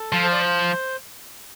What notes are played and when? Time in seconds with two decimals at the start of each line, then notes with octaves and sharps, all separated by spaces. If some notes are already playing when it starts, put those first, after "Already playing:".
Already playing: A4
0.13 F3
0.24 C5
0.32 D5
0.41 C5